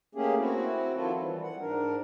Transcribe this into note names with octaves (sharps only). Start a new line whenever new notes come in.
A3 A#3 C#4 G4 G#4
C4 E4 F#4
D#3 F3 F#3 E4 F4 A4
E3 G3
F#5
G#2 D4 A#4